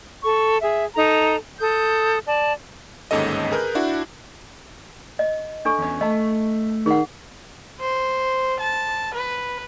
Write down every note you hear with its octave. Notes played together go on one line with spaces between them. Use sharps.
A4 C#6
G#4 E5
D#4 A4 A#5
A4 D#6 G6
D5 A5
G1 D#2 G#2 C#4 A4 D#5
G#4 A#4 B4 F#6 G6
D4 E4 F#4
D#5
D4 A4 C#6
E2 C#4
A3 D#5 A5
D#3 G#4 F#5
C5
A5
B4